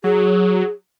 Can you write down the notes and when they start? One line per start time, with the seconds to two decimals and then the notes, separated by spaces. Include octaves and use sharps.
0.04 F#3 G#4